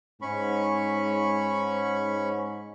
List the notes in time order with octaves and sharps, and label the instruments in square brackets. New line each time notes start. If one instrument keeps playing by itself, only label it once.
[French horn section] G#2 [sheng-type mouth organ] C#4 B5 C#6